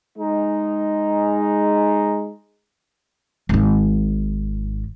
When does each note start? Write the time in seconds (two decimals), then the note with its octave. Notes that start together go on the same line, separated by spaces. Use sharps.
0.18 G#3 D#4 A#5
3.49 G#1 D#4